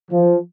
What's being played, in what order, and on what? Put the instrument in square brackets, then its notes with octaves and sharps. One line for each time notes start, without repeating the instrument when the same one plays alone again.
[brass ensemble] F3